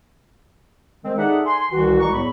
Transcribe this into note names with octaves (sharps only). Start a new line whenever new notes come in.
D#3 G#3 C4
D#4 G#4 A4 D5 E5 F#5
G#5 C6
C2 D#3 E3 F#4
C2 G#3 D5 A#5 C#6
E2 A2 F#3 B5